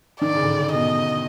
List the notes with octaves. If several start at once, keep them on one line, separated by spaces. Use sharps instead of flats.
D#3 D5
C#3
D3
C#3
C#3
B2 D#5